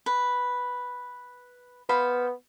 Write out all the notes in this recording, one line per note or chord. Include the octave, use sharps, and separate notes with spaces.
B4
B3 C5 F5 B5